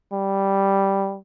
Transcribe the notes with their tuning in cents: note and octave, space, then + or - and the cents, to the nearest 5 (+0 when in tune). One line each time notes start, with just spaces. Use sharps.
G3 -5